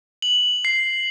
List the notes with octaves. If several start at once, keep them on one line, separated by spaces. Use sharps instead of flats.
F#7
C7